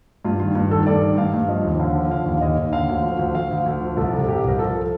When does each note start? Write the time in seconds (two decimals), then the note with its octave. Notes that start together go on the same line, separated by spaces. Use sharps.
0.25 G2 F4
0.40 D#3 F4
0.55 G2
0.71 D#3 A4
0.86 G2 D5
1.02 D#3
1.17 G2 F5
1.34 G2
1.48 F3 D#5
1.64 D#2
1.79 D3 F5
1.95 F3
2.11 D3 F5
2.26 D#2
2.41 D#2 D#5
2.57 D#2
2.72 D3 F5
2.89 D2
3.03 F3
3.19 D2
3.35 D2 F5
3.51 D2
3.66 D2
3.81 F3
3.97 C2 A4
4.13 C3
4.28 C2 G4
4.44 C2 A#4
4.59 F3 A4